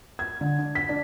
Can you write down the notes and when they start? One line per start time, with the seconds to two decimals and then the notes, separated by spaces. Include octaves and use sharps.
0.19 G#6
0.41 D3
0.58 D4
0.75 B6
0.89 D4